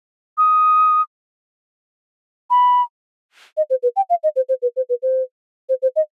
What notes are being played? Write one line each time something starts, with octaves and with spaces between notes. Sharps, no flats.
D#6
B5
D#5
C5
B4
G5
F5
D#5
C5
C5
B4
C5
B4
C5
C5
C5
D#5